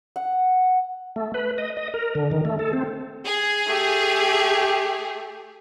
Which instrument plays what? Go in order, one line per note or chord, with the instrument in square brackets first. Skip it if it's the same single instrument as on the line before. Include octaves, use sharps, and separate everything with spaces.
[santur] F#5
[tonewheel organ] A3
B4
D#5
D#5
A#4
D3
D#3
A3
A4
C4
[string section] G#4
[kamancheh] A3 G4